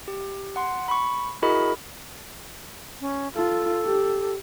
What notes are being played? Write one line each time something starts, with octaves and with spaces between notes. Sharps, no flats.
G4
F#5 C6
B5 C#6
E4 F#4 G#4 A#4 D#5 B5
C#4
F4 A4
G4